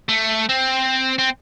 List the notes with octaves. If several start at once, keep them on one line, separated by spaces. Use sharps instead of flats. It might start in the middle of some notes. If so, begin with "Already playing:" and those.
A3
C4
C4